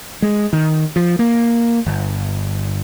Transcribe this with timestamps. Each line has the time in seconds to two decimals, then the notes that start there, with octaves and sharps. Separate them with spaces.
0.22 G#3
0.53 D#3
0.96 F3
1.19 A#3
1.86 G1